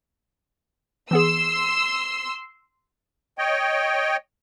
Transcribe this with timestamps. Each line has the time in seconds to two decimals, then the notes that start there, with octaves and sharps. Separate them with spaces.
1.11 E3 B3 G#4 C6 E6
3.38 C#5 D#5 G5